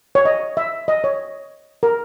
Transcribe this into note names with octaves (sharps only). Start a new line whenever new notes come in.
C#5
D#5
E5
D#5
C#5
A#4